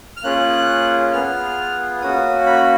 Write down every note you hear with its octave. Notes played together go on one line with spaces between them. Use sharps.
F6
A#3 C#4 F4 G#4 F#6
B3 F4 G#4 F6
A#3 C#4 F#4 D#6
B5